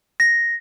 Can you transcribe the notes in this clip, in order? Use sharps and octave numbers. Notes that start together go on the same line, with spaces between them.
A#6